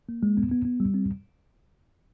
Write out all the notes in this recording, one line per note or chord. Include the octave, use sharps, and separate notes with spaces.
A#3
G#3
B3
B3
B3
G3
C4